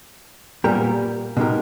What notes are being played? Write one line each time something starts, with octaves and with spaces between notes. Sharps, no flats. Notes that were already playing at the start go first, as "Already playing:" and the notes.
A#2 G3 B3 G4 A#4
B2 G#3 D#4 G4 A#4